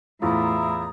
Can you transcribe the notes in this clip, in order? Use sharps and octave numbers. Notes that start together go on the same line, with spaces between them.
E2 A2 E4 F4 A#5 D#6